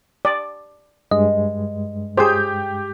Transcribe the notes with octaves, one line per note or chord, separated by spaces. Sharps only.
D5
G2 G#3 D#5
G4 G#4 C5 G5 G6